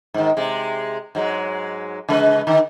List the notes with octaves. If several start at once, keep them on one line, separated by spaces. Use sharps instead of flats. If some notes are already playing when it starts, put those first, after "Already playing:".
G#2 D#3
C3 G#3
G#2 F#3 G#3
C#3 G#3 B4
D3 D#3